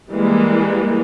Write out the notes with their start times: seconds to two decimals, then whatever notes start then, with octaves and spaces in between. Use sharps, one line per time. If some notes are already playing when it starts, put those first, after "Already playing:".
0.11 E3 G3 G#3 A#3